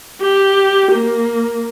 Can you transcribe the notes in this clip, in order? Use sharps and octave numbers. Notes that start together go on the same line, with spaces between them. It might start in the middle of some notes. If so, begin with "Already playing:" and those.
G4
A#3